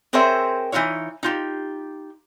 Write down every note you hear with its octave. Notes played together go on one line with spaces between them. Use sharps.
C4 G#4 A#4 C5 C#5 E5
E3 A#3 D#4 F4 C#5
D#4 F4 G4